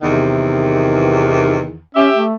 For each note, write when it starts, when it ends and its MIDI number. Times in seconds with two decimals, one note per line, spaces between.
0.02 1.78 40
0.02 1.67 48
0.02 1.78 51
1.95 2.09 61
1.95 2.22 67
1.95 2.22 76
2.15 2.34 57